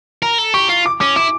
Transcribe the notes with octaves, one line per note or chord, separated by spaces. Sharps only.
A#4 A#5
A4
G4 C#6
F4
D6
C#4 D6
E4 D6